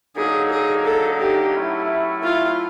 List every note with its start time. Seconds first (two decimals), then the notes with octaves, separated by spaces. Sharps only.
0.16 D3 F#3 A#3 D#4 G#4
0.50 G#4
0.85 A4
1.20 G4
1.55 A2 F#3 A3 C#4 E4
2.23 F4